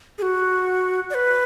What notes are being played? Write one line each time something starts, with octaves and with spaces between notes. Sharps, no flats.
G#4
F#4
D5
B4